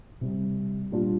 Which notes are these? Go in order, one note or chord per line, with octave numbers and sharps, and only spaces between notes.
C3 G3 C4
A#2 G3 D4 F4